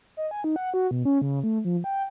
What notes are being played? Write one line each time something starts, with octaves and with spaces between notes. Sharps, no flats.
D#5
G#5
D#4
F#5
F#4
B2
C#4
C#3
A3
F3
G5